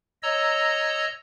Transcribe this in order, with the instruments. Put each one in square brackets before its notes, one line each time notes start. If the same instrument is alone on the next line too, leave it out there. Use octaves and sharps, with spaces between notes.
[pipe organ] C#5 D#5 A#5 E6